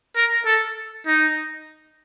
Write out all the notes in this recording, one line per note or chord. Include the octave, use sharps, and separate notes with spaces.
A#4
A4
D#4